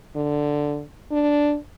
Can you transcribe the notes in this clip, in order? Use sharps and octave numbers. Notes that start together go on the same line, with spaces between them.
D3
D4